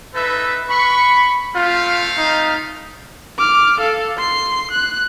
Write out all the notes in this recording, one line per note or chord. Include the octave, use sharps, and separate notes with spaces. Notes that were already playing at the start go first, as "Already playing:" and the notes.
D#4 A4 B4 E5
B4 B5 C#6
A3 C4 F4 F5
D#4
D6 F6
A4 F5
C6 C7
F#6